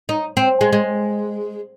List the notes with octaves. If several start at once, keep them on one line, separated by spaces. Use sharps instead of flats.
D#4
C4
G#3
G#3